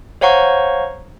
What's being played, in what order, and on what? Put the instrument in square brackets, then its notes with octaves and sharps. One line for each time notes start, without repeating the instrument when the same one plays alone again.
[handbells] C5 C#5 F5 F#5 A#5 C#6